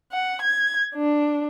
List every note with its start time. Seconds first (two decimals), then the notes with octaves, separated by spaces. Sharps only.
0.12 F#5
0.42 G#6
0.95 D4